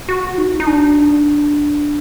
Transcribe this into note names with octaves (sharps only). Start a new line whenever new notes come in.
F#4
D#4
D#4
D4